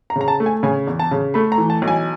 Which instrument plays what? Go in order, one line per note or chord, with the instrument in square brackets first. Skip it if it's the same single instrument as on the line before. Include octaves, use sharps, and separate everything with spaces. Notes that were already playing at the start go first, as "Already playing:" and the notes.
[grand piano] A#5
C#3
A#5
A5
A3
G#5
C#3 G#5
E2
A5
C#3
A3 B5
A#5
E3
A5
B1
G#5